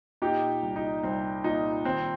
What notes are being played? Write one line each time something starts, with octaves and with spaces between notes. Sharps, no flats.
A#2 D#4 G4
C2
D#4
C2 C4
A#2 D#4
D#3 C4